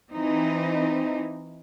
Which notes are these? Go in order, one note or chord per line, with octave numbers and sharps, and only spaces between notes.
E3 C4 D#4